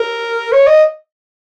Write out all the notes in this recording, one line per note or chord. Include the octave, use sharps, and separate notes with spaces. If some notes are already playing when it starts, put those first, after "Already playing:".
Already playing: A#4
C#5
D#5